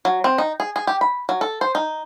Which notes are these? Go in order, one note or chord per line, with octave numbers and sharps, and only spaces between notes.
F#3
C4
D#4
G#4
G#4
G4
B5
F#3
A4
C5
D#4